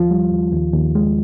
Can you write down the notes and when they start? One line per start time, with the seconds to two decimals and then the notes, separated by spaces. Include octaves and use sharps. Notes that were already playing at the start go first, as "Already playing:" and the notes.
Already playing: D#2 F3 F4
0.11 G3
0.32 D#2
0.53 D#2
0.74 D#2
0.95 G#3